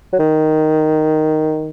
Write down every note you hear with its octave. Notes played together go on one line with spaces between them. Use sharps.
F#3
D#3